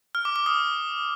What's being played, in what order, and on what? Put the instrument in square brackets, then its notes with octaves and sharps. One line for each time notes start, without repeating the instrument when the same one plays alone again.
[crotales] F6
D6
D6
D#6